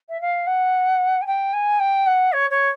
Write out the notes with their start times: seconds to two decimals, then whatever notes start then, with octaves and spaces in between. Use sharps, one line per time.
0.09 E5
0.21 F5
0.47 F#5
1.22 G#5
1.26 G5
1.53 G#5
1.80 G5
2.06 F#5
2.32 C#5
2.50 C#5